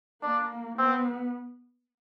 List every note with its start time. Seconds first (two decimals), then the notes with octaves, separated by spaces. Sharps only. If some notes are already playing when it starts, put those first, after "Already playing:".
0.23 A#3 D4
0.78 B3 C4